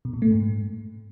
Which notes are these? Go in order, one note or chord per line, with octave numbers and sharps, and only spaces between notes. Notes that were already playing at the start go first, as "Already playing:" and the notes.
B2
A#2
A3
G#2